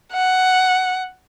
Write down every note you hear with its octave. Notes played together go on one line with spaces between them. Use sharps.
F#5